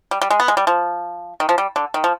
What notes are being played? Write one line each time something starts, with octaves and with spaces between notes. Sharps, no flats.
G3
G3
G#3
B3
G#3
G3
F3
D#3
F3
G3
D3
D#3
F3